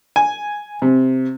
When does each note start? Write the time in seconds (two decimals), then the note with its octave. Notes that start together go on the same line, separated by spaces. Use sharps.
0.16 G#5
0.82 C3